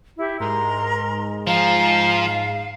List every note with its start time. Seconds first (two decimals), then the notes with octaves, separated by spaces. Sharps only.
0.18 E4 G4 E5
0.40 G#2 G#3 A#4 A#5 C6
1.47 F3 F5 G#5 A#5